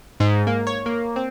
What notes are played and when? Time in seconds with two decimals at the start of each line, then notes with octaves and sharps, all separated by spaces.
0.20 G#2
0.47 A#3
0.67 C#5
0.86 A#3
1.16 C4